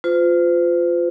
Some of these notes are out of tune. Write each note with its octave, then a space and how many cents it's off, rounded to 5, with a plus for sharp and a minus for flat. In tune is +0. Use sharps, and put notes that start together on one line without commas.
F4 +5 C5 -40